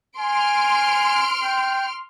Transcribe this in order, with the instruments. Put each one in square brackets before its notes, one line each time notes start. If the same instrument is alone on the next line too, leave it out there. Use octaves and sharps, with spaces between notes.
[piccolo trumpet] G#5 [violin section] C6 F6 D7
[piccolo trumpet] G5